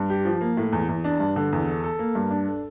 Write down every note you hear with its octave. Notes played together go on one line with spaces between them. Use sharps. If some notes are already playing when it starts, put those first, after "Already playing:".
Already playing: G2
G4
F3
A#3
A2
E2
E2
D4
G2
D3
E2
A4
A4
A#3
G2
D4
A4